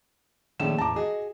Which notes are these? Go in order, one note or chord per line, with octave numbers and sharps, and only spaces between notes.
A#1 D#3 A3 C#4 E7
E2 A2 A5 A#5 D6
F#4 G#4 D#5